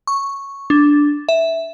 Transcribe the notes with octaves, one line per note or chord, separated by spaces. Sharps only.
C#6
D4
E5